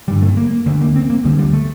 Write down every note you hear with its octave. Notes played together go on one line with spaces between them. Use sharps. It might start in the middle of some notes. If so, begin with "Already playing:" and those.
G1 G2 D3 G3
A3
A#3
D2 D3 A3
A#3
C4
A#3
D2 D3 G3
G3
A3